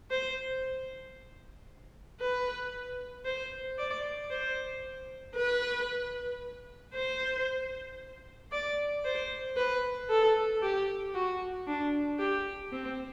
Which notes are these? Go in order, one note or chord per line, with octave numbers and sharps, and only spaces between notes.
C5
B4
C5
D5
C5
B4
C5
D5
C5
B4
A4
G4
F#4
D4
G4
C4